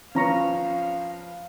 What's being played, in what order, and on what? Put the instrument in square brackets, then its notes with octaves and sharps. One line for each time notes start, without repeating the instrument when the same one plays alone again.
[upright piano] F3 B4 [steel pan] C#4 A#5 C#6 [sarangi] F5